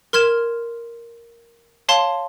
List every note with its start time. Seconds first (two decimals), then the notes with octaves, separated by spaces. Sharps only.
0.13 A#4 C6 F6 G#6 E7
1.89 C#5 F5 A5 C6